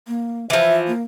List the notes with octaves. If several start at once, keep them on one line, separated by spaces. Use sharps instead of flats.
A#3
E3 F3 E5
A#3